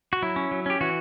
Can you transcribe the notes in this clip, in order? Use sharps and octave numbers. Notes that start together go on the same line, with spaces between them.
F#4
F#3 E4
C#4
F#3
C#4 G4
E3 F#4